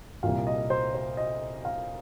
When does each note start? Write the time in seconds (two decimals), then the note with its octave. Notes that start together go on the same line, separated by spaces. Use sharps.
0.23 C2 A#2 F5
0.47 D#5
0.70 C5
0.95 C5
1.17 D#5
1.65 F5